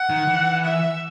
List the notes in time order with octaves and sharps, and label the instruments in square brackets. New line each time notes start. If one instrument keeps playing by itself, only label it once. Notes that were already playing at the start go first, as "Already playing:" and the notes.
Already playing: [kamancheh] F#5
[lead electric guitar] D#3
E3
[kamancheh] E5